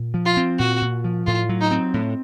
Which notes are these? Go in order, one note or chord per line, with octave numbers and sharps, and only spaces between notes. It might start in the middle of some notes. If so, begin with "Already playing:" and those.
Already playing: A#2
F3
F4
C4
A#2 F#4
A#2
F3
A2 F4
F#3
D#4
C4
A2